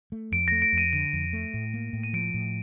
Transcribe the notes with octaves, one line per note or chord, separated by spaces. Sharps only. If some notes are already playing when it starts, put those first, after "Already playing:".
A3
F2 D7
A3 A#6
D7
F2
D#7
D3 D#7
F2
A3
A2
A#3
A2
D#7
F3 D7
A2